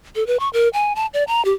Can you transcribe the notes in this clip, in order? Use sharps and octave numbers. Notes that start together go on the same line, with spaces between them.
A4
B4
C#6
A#4
G#5
A5
D5
A#5
G4